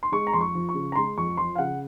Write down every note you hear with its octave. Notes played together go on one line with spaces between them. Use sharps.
C6
G#3 C#6
A#5
F2 C6
C#6
F3
C#6
C#3
A#5
G#3 C6
F2 C#6
F3 C6
F5
C#3 F#5